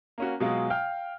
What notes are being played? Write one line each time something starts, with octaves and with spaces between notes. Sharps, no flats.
A#3 C#4 F#4
B2 F#3 G#3 F4
F5 G5 F6